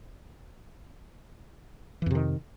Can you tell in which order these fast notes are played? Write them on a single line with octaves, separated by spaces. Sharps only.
E3 F2 C3 D#3